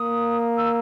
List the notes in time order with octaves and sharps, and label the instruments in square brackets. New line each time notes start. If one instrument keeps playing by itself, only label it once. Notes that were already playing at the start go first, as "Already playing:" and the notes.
Already playing: [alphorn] A#3 [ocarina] D#6
[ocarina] E6